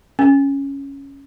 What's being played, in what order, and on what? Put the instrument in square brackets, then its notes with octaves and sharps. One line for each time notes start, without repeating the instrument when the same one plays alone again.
[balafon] C#4